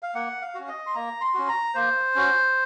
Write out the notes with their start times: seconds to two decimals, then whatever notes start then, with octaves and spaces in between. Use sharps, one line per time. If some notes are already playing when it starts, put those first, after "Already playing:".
0.03 F5
0.15 A#3 F#5
0.42 F5
0.55 C#4 F#4
0.68 D#5
0.86 C6
0.94 A#3 A#5
1.21 C6
1.34 C#4 F#4
1.48 A#5
1.74 A#3 C5
2.15 C#4 F#4